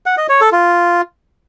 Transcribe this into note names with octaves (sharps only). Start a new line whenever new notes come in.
F#5
D#5
C#5
A4
F4